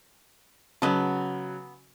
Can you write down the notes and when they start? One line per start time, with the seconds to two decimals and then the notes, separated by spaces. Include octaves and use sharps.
0.82 C#3 F#3 B3 D#5 A5